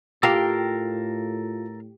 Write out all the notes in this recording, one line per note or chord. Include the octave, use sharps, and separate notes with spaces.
A2 F4 G4 A4 A#4 F5